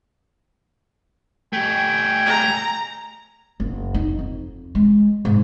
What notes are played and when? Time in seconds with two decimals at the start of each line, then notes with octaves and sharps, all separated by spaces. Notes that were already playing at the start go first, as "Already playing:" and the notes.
1.53 A3 G4 G5 G#5
2.26 A#5
3.60 F#1
3.94 D#4
4.19 F2
4.75 G#3
5.25 G#2